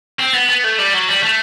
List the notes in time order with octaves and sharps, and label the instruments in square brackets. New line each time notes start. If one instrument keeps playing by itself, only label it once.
[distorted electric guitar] C4
B3
B3
A3
G3
F#3
G3
A3